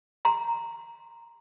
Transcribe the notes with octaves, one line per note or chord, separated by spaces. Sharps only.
A#5 C6